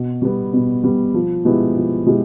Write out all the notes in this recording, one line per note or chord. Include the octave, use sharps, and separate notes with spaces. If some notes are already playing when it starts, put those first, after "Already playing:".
Already playing: B2
G3 B3
B2
G3 B3
F3
G#3 B3 E4 G4
F3
G#3 B3 E4 G4